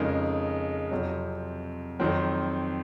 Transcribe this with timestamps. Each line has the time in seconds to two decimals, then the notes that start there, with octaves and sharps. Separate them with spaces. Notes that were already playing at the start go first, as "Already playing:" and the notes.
Already playing: F2 C#3 G#3 D#4 A#4
0.91 F2 C3 F#3
2.00 F2 D#3 F#3 C4